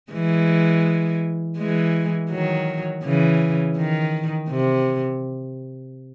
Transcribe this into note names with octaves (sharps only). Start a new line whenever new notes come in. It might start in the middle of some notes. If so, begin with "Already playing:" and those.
E3 G#3
E3 G#3
D#3 F#3
C#3 E3
D#3
C3